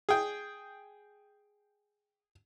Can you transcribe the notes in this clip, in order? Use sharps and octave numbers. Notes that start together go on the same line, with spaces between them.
G#4 G5